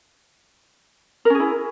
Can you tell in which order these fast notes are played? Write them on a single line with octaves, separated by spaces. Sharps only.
A#4 C#4 G#4 E4